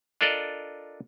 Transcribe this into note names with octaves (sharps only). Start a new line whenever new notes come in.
D4 F4 A4 A#4 D5 D#5